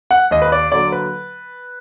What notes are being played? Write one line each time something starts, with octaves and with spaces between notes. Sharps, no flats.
F#5
D#2 D#5
B4
D5
D3 F#3 A#3 D5
B4